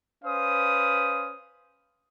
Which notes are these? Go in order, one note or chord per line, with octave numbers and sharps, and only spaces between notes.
C#4 B4 C5 F5 D#6